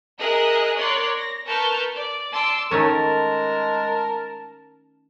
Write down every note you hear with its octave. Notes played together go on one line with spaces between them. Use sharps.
G#4 A#4 D#5 E5 F#6
A#4 C#5 D5 C6 F#6
A#6
A#4 B4 A5 C#6 F6 G6
D5
A5 C6 D6 E6
D#3 G#3 A3 C#4 A#4 A5